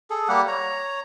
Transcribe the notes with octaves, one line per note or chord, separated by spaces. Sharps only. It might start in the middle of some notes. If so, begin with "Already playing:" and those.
G#4 A4
G3 A#3 G4 F#5
C#5 A#5